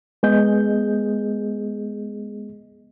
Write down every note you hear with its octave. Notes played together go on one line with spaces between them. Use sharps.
G#3 B3 G#4 D#5 G6